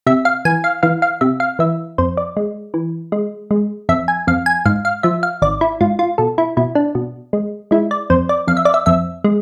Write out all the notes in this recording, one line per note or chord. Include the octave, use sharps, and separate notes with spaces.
C3 E5
F5
E3 G#5
F5
E3 F5
F5
C3 E5
F5
E3 E5
F2 C5
D5
G#3
E3
G#3
G#3
F2 E5
G#5
F2 F5
G#5
G#2 F5
F5
F3 E5
F5
G#1 D5
E4
G#2 F4
F4
B2 A4
E4
B2 E4
D4
B2
G#3
G#3 E4
D5
F2 C5
D5
F2 F5
E5
D5
E5
F2 E5
G#3